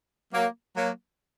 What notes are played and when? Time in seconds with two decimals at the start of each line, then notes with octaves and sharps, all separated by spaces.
0.33 F#3 A#3
0.76 F#3 A#3